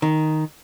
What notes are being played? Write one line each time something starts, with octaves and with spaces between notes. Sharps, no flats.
D#3